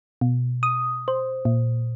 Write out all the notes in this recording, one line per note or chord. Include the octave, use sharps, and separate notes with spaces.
B2
D#6
C5
A#2